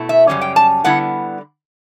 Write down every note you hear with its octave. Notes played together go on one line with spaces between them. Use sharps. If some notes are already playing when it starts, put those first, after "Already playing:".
Already playing: B2 A3 E4
E5
F#2 C#3 E3 G3 C#4
G5
A5
D3 G3 B3 E4 F#5